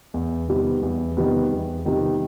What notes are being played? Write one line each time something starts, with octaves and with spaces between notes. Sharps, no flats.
E2
C3 D#3 G3 B3
E2
C3 D#3 G3 B3
E2
C3 D#3 G3 B3